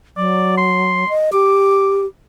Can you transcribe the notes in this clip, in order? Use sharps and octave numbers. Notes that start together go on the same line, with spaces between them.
F#3 D5
C6
D#5
G4 D6